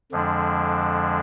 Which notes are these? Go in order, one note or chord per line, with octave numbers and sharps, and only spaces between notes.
F2 D3 F3 G#3 D4